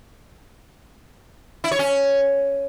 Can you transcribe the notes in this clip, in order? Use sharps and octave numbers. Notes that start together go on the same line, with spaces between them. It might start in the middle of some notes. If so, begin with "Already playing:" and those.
E4
C#5
C#4